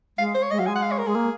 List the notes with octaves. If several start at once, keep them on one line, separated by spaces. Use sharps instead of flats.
G#3 F5
C5
C#5
G#3 D#5
F#3 F5
G#3 G#5
F#5
F5
C#5
A#4
G#3 G#4
A#3